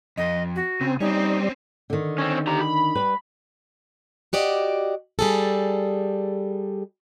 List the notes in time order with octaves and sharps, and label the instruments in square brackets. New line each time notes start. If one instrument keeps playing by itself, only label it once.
[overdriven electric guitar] F2 [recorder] D#5
[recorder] F#4
[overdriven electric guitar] C#3 [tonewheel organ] C4
[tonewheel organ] G3 [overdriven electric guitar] C4 C#4 [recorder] D#4
[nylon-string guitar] D3 D#3
[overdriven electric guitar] C4 C#4
G4 A#5
B5
[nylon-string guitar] G3 B4
[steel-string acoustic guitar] F#4 G4 D5 D#5
G3 G#4 A4